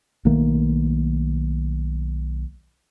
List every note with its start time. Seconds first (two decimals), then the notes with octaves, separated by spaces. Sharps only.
0.25 B1 D#3 A3 A#3